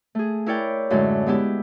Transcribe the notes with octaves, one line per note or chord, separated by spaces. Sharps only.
A3 G#4
E4 A#4 C#5 D5 G5
F#2 A2 D3 G#3
G#3 B3 E4 G4